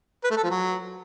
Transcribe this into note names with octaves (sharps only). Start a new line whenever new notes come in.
B4
A3
A4
F3
F#3